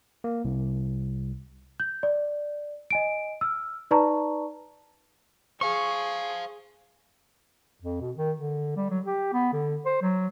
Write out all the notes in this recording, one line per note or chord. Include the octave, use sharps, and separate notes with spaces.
A#3
C2
G6
D5
D#5 G#5 D7
E6 F6
D#4 B4 D5 A5 A#5 C#6
G#4 C5 F5 C#6
F2
B2
D#3
D3
G3
F#3
G4
B3
D3
C5
F#3